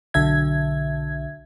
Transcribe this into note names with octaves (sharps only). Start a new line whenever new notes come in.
B1 D3 E5 G#6